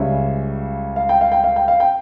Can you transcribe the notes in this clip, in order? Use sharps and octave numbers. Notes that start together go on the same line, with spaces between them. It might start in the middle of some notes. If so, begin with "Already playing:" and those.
Already playing: C#2 C#3 G3 C#5 E5
F5
G5
F5
G5
F5
G5
F5
G5